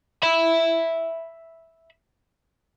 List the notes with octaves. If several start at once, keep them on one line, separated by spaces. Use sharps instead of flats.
E5 B5